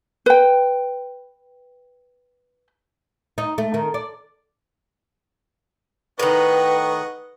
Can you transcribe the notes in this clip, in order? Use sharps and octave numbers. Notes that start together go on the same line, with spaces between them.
B4 G5
D#4
A3
D#3
D5
A2 D#3 B4 D#5 F#5 C#6